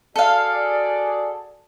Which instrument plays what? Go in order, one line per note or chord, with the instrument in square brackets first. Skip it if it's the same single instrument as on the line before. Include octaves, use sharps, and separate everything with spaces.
[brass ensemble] F#4 G#4 D5 [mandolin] A4 F5